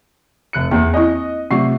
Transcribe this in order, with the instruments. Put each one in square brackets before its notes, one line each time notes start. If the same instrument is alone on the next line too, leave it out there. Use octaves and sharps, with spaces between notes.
[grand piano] F1 F#6 C#7
[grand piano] E2 [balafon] A#3
[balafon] C4 E4 [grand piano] D#5
[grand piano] C3 C#6 C7 [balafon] F#3 A3 F4